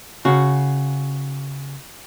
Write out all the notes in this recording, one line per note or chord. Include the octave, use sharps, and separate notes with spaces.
C#3 F#4